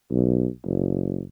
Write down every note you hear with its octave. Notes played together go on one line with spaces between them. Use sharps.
B1
F#1